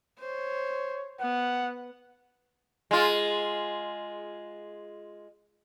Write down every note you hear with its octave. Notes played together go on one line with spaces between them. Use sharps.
C5 C#5
B3 F#5
G#3 F4